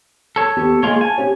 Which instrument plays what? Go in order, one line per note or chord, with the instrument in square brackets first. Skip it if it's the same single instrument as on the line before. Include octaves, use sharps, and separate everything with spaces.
[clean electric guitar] A4 C#5
[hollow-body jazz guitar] D#2 B3 G4
[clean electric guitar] G#3 F4 C#5 [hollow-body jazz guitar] A#3 G#4
[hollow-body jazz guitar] F5 A5 [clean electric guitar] G#5
[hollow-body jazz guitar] C#4 G4 C#5